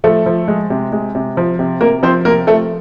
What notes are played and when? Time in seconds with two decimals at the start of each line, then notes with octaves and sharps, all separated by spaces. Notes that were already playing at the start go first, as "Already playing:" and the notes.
0.04 F3 A3 A4
0.26 F3
0.48 G#3
0.70 C3
0.92 G#3
1.15 C3
1.37 F3
1.59 C3
1.81 C3 A#3 A#4
2.03 F3 C4 C5
2.25 C3 A#3 A#4
2.47 F3 A3 A4